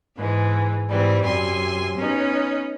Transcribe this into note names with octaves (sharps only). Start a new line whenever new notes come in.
G#2 E3 G#3
G#2 E3 G3 C4
F#2 C3 G#5 C6
B3 C#4 D#4